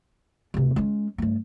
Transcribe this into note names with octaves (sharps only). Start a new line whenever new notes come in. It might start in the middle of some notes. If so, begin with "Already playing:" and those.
D2 C3
G#3 C#4
G2 A3